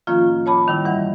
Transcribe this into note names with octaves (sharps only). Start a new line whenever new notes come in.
A2 D#3 F3 A#3 C#4 F4
C#5 A5 B5 D6
D#3 G3 E4
G2 E3 F#5